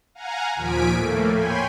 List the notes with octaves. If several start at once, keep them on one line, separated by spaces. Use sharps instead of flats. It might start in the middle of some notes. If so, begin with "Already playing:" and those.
F5 F#5 G#5 A#5
D#2 A#2 F3 G#5 B6 D7
A2 A3 A#3
C#5 G5 G#5 B5 C6